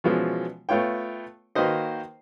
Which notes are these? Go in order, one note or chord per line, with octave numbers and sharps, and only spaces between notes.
B2 E3 F3 G#3 B3 C#4
A3 B3 F4 C#5 G5
D#3 A#3 F#4 B4 C5 D#5